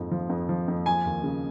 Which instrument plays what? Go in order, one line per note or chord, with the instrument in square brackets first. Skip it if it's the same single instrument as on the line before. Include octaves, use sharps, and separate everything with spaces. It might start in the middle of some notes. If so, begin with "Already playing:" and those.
Already playing: [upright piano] F2 G#2 F3
F3
F2
F3
F2
F3 G#5
D#2
C#3